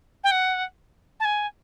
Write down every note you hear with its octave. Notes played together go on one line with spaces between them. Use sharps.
G5
F#5
A5
G#5